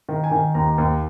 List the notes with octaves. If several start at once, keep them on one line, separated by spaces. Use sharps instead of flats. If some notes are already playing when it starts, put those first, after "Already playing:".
D#3
G#5
D#3
D#2 A#5
D#2